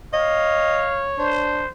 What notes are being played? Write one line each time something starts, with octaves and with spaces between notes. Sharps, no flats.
C#5 D#5 F5
D4 C5